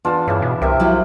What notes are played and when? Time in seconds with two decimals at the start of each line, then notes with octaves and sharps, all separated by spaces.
0.05 E2 D4 F4 A5
0.28 G2 C#3 D4 E4
0.42 B2
0.61 C2 C3 G4 A#4 E5
0.80 F3 F#3 E4